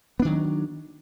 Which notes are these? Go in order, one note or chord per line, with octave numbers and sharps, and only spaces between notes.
D#3 F#3 B3 D4